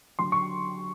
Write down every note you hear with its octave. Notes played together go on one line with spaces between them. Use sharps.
D3 F#3 C6
C#6